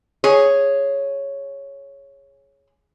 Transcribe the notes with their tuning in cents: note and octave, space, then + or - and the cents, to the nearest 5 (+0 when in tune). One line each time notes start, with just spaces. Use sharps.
G#4 +0 C#5 +0